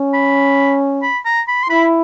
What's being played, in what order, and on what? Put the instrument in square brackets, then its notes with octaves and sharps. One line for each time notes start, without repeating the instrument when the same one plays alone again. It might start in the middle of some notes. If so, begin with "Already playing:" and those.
Already playing: [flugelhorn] C#4
[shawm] B5
B5
A#5
B5
C6
[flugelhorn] E4 [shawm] B5